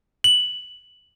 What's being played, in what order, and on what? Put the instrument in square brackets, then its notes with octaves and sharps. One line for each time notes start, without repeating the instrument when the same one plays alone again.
[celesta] F#7